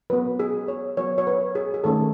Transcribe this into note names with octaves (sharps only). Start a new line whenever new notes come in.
F#3 B3 B4
G#4
C#5
F#3 B3 C#5
C#5
B4
G#4
G#4
D#3 A3 C#4 A4